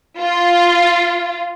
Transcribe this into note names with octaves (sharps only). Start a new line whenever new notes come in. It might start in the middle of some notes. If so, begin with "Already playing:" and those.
F4